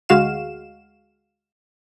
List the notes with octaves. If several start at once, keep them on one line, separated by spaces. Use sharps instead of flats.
D2 G#3 F#4 F5 E7